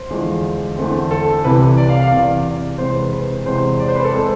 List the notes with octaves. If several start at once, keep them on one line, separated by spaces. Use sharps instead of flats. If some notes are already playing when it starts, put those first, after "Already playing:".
Already playing: C5
E2 D3 F3 G#3
E2 D3 A3 C4
A4
C2 C3 E3 B4
D5
F5
F5
E2 C3 E3 D5
E2 C3 G#3 C4 C5
B4
B4
E2 C3 G#3 C4 C5
D5
C5
B4
A4
G#3 C4